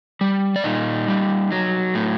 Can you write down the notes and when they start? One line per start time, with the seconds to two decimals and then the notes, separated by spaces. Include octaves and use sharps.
0.21 G3
0.56 D5
0.64 A#2 D#4 D#5
1.08 G3
1.52 F#3
1.95 A2